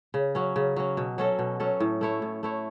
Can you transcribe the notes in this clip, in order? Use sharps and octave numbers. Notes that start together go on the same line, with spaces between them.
C#3
F#3 C#4
C#3
F#3 C#4
B2
F#3 C#4 A4
B2
F#3 C#4 A4
A2
A3 E4 C#5
A2
A3 E4 C#5